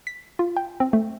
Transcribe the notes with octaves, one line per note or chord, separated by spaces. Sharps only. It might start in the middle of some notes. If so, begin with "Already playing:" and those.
B6
F4
G5
C4
A3